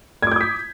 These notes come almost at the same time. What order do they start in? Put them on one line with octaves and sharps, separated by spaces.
G#6 D6 G6 D#6 B6